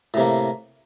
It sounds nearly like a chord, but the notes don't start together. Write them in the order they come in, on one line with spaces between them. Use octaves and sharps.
A2 C3 A#3